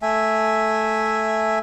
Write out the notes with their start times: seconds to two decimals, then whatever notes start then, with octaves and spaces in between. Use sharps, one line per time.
0.02 A3 E5 G#5